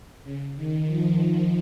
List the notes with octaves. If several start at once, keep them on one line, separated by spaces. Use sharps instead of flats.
C#3
D#3
F3